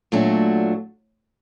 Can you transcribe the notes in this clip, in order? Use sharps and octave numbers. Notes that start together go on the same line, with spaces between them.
A#2 F#3 A3 D4 F#4